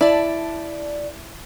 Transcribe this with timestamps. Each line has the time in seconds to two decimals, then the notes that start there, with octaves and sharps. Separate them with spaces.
0.01 E4 D5 A5